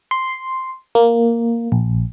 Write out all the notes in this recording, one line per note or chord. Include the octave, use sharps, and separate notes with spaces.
C6
A#3
A#1